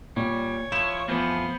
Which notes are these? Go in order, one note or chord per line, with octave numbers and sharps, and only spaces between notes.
A#2 G3 C#5
F3 E4 E7
F2 E3 F3 B3 C5